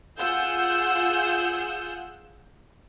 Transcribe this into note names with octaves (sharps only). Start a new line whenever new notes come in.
F4 G#4 F#5 E6 G6